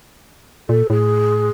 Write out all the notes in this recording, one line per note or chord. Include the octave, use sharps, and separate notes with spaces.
A#2 A4
A2 G#4